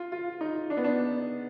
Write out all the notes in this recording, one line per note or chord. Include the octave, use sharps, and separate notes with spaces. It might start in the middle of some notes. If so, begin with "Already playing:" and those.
Already playing: F4
F4
D#4
D4
B3
D4